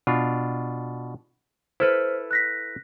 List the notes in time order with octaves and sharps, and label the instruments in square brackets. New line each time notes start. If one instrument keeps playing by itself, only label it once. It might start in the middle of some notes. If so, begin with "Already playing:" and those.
[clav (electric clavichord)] B2 D4 F4
[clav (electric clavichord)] E4 A4 B4 [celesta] C5 F6
[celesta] F#6 A#6 B6